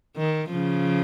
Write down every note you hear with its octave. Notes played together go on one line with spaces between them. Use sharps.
D#3
C#3 F3